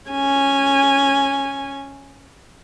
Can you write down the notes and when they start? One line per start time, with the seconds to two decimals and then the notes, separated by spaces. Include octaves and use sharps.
0.10 C#4 G#5